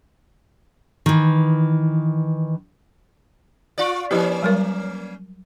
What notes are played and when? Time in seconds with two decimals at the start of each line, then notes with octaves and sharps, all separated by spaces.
1.06 D#3 E3
3.78 F4 D5
4.11 F3 A#3 C#4 E4 G4
4.43 F#3 G3 A#4